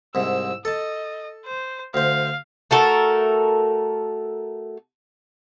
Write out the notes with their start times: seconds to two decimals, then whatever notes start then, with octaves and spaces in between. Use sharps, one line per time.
0.15 C2 G#2 E6
0.65 A4 D#5 A5
1.45 C5
1.94 D2 C5 F5
2.71 A3 F#4 A4 A#4